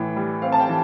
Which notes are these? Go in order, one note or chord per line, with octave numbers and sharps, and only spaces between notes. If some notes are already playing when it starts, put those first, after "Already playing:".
Already playing: A2 E3
G3
C4 F5
A5
G5
E3